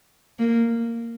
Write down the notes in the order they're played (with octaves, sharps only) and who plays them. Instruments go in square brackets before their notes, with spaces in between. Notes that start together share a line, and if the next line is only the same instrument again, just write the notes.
[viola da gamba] A#3